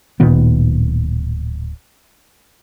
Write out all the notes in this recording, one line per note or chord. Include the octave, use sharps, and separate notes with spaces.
D1 A#2 D#3 B3